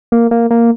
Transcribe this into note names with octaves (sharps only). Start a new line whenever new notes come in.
A#3
A#3
A#3